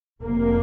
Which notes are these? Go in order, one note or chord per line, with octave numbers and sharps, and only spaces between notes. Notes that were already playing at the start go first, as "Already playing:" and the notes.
F1 F2 C3 A#3